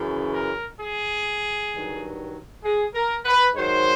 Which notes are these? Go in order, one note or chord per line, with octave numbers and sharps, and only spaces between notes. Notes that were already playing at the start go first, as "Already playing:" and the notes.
Already playing: F#2 C#3 E3
A#4
G#4
G2 D#3 F#3
G#4
A#4
B4
G#2 D#3 F#3 C5